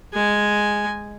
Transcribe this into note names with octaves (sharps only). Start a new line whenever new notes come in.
G#3 G#5